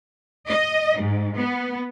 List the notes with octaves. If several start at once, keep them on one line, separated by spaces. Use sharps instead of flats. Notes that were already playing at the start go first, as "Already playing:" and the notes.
D#5
G#2
B3